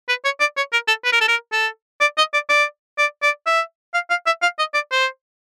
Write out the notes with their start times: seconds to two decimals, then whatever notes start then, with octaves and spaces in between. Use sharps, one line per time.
0.09 B4
0.25 C#5
0.40 D5
0.57 C#5
0.73 A#4
0.88 A4
1.05 B4
1.13 A#4
1.21 A4
1.28 A#4
1.53 A4
2.01 D5
2.18 D#5
2.34 D5
2.49 D5
2.98 D5
3.23 D5
3.47 E5
3.94 F5
4.10 F5
4.27 E5
4.42 F5
4.59 D#5
4.74 D5
4.92 C5